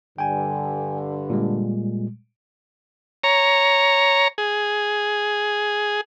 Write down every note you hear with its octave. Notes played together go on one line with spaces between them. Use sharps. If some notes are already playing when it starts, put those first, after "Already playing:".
G2 D3 G5 G#5
A#2 G3 G#3
C#5 A#5
G#4